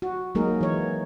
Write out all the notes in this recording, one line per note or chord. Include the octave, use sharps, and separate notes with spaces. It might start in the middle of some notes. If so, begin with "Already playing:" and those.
F#4
F#3 G#3 A#3 D#4 G#4 A#4
E3 C#5